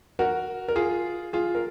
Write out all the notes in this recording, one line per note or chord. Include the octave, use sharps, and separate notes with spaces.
F#4 A#4
A#4
F4 G#4
F4 G#4
A#4